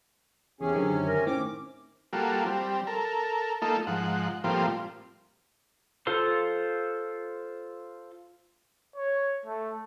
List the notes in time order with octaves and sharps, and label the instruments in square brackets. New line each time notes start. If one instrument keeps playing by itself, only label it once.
[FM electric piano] E2 [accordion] C3 C#4 [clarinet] G#4
[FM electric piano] F#2 D3 D#3
[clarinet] A#4
[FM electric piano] A2 D#3 C4 [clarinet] C#4 [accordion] D6
[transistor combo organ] G3 A#3 F4 F#4 A4
G3 C4
A4 A#4
A3 A#3 D#4 F4 A4
G#2 F3 F#5
A2 F3 G3 A#3 C4 F4
[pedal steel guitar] F4 A4 C5 C6
[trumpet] C#5
A3